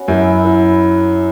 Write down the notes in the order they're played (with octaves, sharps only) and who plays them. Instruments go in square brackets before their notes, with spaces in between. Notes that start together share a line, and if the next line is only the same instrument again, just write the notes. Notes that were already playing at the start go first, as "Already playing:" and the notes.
Already playing: [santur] B3 C#4 F#4 C#5
[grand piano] F#2 [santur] E4 B4 E5
[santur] E4 B4 E5